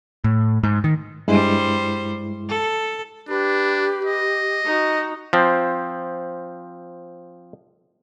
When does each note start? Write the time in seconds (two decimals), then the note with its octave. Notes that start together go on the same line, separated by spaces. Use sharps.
0.24 A2
0.63 G#2
0.84 D#3
1.28 G2 G3 G#3 E4 C5
2.49 A4
3.29 D4 G4 B4
4.04 D#5
4.65 D#4 F#4
5.33 F3 C4